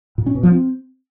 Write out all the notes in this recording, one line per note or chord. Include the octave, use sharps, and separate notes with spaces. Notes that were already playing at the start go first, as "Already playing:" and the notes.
A#2
C#4
B2
F3
C4